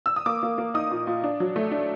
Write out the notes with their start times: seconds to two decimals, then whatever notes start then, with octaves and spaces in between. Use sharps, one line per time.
0.06 E6
0.16 D#6
0.26 A#3 D6
0.43 A#3
0.58 A#3
0.74 D#4 D#6
0.91 A#2
1.07 A#2
1.24 D4
1.40 F#3
1.56 A3
1.71 D4